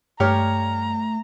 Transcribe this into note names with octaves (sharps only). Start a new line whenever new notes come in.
G2 A3 G4 C#5 A#5 F6